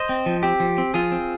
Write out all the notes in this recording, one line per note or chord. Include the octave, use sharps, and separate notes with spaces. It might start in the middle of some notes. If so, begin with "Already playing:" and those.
Already playing: C5 D#5
C4
F3
C4 G4
F3
C4
F3 F4 G#4
C4